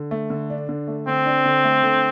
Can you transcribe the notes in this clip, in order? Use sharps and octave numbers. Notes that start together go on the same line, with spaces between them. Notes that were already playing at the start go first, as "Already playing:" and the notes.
Already playing: D3
A3
D3
D4
D3
A3
D3 C4
D4
D3
A3
D3